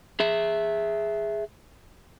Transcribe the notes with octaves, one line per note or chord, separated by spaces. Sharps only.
G#4 E5